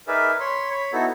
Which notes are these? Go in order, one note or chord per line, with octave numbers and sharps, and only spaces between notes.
D#4 G#4 A#4 B4 D5 E5
C#5 B5 C6
C#5 B5
B3 D#4 E4 F#4 A4